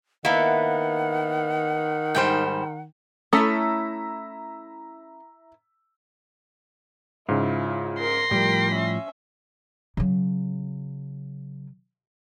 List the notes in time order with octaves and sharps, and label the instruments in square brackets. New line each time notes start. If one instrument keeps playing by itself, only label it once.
[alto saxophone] D#3 [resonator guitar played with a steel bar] A#3 B3 [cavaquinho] E4 E5 [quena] F#5
[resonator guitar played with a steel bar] G#2 G3 C5 [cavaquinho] G5
[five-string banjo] A3 C#4 A4 [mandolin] E4 D#6 [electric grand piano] A#5 E6 B6
[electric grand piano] G#2 C#3 [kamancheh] E4 [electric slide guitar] F4
[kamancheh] A#4 [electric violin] C6 A#6
[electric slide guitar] A2 F3 [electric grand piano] G3 [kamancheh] A#4 G5
[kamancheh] C#4 E5
[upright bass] C#3 F#3